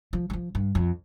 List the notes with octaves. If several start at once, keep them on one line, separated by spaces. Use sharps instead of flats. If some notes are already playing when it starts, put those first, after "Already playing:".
F3
G3
F3
G2
F2